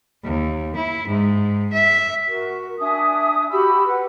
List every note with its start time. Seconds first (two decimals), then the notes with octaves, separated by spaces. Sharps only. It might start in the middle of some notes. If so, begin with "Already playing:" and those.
0.24 D#2
0.76 E4
1.08 G#2
1.73 E5
2.27 F#4 A#4
2.79 D4 E5 G#5 D#6
3.50 F#4 G4 B5 E6
3.86 B4 F#5